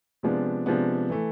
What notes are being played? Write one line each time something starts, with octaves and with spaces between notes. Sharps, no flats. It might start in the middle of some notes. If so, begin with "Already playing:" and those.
C3 F3 G#3 B3 D4
C3 F3 G#3 B3 D4
E3 A3